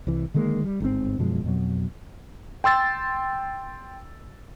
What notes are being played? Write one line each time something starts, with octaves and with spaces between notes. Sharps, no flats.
C2 E3
D3 D#3 G#3 A#3
G3
G1 G#2 C#3 C4
F#2 B2 F3 G#3
F2 B2 F#3
G5 C6 E6 A6